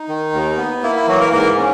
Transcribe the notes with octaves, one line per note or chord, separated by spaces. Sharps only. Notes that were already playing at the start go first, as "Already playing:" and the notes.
Already playing: D#4
D#3
D#2
B3
A#3 E4
E4
E3 F#3 F#4
A#3 A#4
G#2 A#3 A#4
C#4